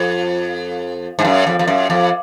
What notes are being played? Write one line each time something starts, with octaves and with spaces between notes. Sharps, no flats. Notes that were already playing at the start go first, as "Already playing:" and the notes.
Already playing: F2
G#2
F#2
F2
F2
F#2
F2